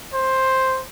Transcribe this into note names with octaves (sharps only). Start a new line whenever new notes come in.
C5